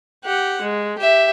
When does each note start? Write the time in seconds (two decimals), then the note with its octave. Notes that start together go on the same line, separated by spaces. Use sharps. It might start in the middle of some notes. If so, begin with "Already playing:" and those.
0.24 G4 F#5
0.62 G#3
0.98 G4 E5